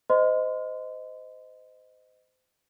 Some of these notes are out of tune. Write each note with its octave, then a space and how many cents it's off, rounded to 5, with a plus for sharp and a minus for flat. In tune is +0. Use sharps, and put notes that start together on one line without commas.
C5 -30 D#5 +0 C6 -30